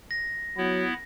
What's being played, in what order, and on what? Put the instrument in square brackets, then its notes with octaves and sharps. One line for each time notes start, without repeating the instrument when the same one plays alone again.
[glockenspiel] A#6
[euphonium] F#3 [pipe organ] B3 E4